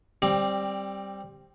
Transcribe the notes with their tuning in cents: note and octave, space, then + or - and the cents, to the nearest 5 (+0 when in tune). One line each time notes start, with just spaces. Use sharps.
G3 +0 C4 +20